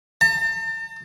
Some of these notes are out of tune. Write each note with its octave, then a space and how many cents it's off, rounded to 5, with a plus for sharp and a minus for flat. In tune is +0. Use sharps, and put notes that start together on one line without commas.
A5 +40